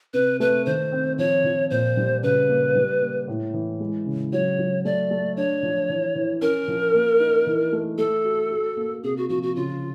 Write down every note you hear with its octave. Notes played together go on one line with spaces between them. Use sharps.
C3 B4
A3 B4
D#3 C5
C4
F3 C#5
F3
A#2 C5
G3
C#3 B4
A#3
G3
A#3
A2
E3
G#3
C#3
F#3 C#5
F#3
A3 D5
A3
D4 C#5
F3
E3
E3
C#4 A#4
F3
A#3
D#4
E3
A3
A3 A4
F#4
F#4
A#3
C3 G#4
F#4
F3 F#4
F#4
C#3 F4